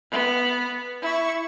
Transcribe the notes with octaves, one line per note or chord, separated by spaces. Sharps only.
B3
E4 C#6